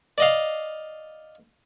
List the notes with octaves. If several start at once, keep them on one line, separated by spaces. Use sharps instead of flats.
D5 D#5 F5